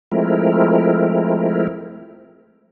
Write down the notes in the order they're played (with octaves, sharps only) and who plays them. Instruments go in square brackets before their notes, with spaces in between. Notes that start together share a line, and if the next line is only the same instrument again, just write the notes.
[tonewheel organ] F3 G#3 A3 C4 E4 A#4